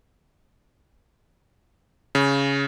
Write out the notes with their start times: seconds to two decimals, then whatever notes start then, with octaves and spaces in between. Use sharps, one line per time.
2.15 C#3